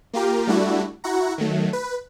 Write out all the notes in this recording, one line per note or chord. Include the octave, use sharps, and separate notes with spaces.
A#3 F4 G4 A#4
G3 A3 D4 E4 F#4
E4 F#4 F#5 A#5
D#3 F#3 A3
B4